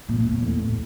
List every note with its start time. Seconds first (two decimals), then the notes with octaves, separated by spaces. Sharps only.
0.09 A#2
0.20 A#2
0.31 E2
0.42 A2